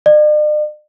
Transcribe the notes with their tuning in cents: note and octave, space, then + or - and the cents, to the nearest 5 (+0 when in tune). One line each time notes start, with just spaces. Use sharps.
D5 +45